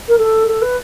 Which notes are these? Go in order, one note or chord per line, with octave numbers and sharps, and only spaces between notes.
A#4
A4
A4
B4